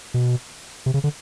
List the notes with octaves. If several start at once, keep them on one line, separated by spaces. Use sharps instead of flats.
B2
C3
C#3
D3